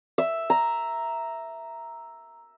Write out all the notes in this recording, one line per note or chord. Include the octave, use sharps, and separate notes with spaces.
E5
A#5